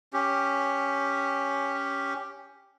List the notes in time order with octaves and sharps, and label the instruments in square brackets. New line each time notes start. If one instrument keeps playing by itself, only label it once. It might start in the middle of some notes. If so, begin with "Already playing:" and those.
[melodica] C#4 G4